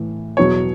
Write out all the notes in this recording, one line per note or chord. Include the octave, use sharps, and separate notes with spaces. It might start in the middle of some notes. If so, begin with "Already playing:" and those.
Already playing: A2 E3
E2 B2 F#3 C#5